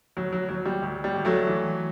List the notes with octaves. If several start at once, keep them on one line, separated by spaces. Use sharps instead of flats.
D2 F#3
F#3
D2 F#3
G3
D2
G3
D2
F#3 A3
E3